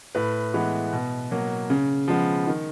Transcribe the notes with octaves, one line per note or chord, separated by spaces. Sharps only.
A2 B4
E3 G#3 B3
B2
F#3 A#3
C#3
F3 G#3 B3
D#3